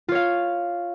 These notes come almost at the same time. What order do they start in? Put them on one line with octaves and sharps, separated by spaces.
F4 C#5 F5